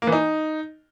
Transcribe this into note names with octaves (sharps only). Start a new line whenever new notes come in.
A#3
E3
D#4